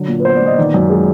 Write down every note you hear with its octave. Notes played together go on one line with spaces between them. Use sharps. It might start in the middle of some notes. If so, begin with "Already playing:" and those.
Already playing: D3 F#3
A#2
B4
B3 C5
D5
A#2
D#5
D#3 D5
F#2
G#3